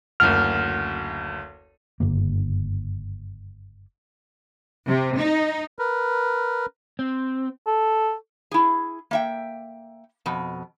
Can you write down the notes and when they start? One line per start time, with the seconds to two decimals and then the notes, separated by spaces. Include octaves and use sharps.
0.20 F#1 D2 F6
2.00 F#1 G2 D3 A#3
4.87 C3
5.19 D#4
5.79 A#4 B4
6.99 C4
7.67 A4
8.51 E4 G#4
9.11 A#3 E5 G5
10.26 F2 B2